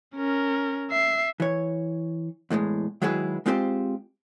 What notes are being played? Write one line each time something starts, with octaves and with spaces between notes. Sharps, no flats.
C#4 A#4
E5 C7
E3 C#5
E2 A2 D3 G#3
D#3 F#3 G#3 E4 G#4 B4
G#3 C4 F4 G4 B4 C5